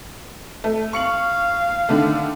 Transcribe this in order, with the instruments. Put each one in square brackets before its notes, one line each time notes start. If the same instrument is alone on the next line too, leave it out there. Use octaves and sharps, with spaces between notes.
[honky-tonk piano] A3
[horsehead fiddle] F5 [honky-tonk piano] C#6 C#7 F#7
[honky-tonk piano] D3 D#3 A3